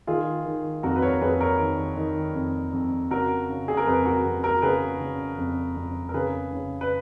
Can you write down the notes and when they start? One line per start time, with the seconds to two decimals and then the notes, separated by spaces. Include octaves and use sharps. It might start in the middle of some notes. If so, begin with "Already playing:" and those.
0.07 D#3 F4 G#4
0.45 D#3
0.83 F2 F#4 A#4
0.96 B4
1.02 A#4 C#5
1.21 F2 G#4 B4
1.40 A#4 C#5
1.59 D#3
1.97 D#3
2.35 F2
2.73 F2
3.11 C#3 F#4 A#4
3.49 C#3
3.68 G#4
3.77 A#4
3.87 F2 G#4 B4
4.06 F#4 A#4
4.24 F2
4.43 F#4 A#4
4.62 C#3 G#4 B4
5.00 C#3
5.38 F2
5.76 F2
6.09 A#4
6.14 C#3 G#4 B4
6.52 C#3
6.81 B4